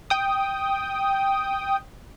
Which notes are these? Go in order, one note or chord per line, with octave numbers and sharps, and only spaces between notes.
G5 D#6